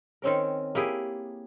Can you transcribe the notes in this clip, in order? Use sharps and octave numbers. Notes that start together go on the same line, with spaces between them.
D#3 C4 C#4 A#4
A#3 E4 G4 G#4